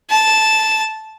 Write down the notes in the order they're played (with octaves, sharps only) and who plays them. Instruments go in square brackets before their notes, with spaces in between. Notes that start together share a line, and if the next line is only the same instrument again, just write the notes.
[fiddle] A5